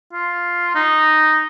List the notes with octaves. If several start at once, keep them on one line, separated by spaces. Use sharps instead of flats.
F4
D#4